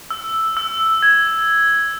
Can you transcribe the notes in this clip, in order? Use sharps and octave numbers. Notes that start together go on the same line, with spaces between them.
E6
E6
G#6